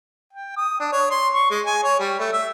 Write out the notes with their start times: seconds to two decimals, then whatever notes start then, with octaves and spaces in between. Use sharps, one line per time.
0.33 G5
0.57 D#6
0.80 D4
0.92 C#5
1.11 C6
1.34 C#6
1.51 G#3
1.66 G#5
1.84 C#5
1.99 G3
2.20 A3
2.33 E5